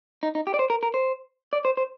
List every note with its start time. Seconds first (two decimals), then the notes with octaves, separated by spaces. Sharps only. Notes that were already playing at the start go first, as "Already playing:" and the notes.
0.23 D#4
0.35 D#4
0.47 G4
0.54 D5
0.59 C5
0.70 A#4
0.83 A#4
0.94 C5
1.53 D5
1.65 C5
1.77 C5